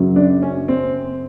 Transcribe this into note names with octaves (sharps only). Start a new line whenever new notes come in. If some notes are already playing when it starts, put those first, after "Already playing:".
Already playing: F#2 C#3 F#3
D4
C#4
C4